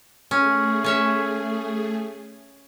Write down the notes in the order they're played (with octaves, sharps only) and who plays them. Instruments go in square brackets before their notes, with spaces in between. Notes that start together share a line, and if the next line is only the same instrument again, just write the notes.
[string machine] A3 G#4 [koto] C#4
[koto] C#4 C#5 E5